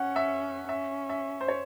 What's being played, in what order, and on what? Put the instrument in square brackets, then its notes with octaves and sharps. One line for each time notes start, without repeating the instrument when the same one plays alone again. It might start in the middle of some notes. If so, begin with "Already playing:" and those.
Already playing: [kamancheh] C#4 [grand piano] F#5
[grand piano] E5
[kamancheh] C#4 [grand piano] E5
[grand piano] E5
C5
C#5